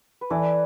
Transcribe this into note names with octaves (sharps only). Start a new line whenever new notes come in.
B4
E3 A4 D5